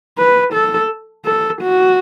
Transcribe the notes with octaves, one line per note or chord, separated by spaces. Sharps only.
B4
A4
A4
F#4